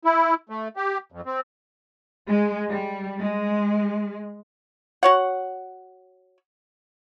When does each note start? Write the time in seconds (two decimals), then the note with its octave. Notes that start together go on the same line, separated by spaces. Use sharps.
0.05 E4
0.50 A3
0.77 G4
1.12 F2
1.26 C4
2.28 G#3
2.71 G3
3.20 G#3
5.03 F#4 C#5 F#5